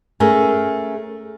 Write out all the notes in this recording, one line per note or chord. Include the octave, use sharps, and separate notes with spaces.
A3 C#4 G#4 A#4